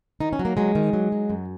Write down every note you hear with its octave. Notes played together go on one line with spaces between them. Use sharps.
D#3 D#4
C#4
F#3
A#3
F#3 G#3
D#3
F#3
F#3
F#2